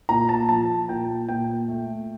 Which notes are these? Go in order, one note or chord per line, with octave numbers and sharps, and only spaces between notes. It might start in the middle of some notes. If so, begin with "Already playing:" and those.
A#2 A#5
A5
F3 A5
A#2 G5
A#2 G5
A3